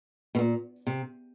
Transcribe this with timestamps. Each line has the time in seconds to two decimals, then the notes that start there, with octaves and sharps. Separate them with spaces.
0.35 B2
0.39 A#2
0.87 C3